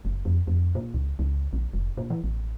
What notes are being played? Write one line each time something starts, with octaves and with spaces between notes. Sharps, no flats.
F#1
F2
F2
A#2
C#2
C#2
A#1
F1
A#2
E3
A1